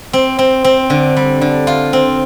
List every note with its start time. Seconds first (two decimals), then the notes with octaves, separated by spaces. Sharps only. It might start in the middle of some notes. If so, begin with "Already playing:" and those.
0.13 C4
0.39 C4
0.64 C4
0.90 D3
1.17 G3
1.41 D3
1.67 F4
1.93 C4